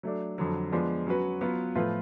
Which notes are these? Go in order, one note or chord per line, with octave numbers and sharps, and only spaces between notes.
F#3 A3 D4
F2 D3 F#3
F3 G#3 B3 D4
F#3 C#4 F#4 B4
F#3 B3 F4 B4
A2 F3 A3 F4 B4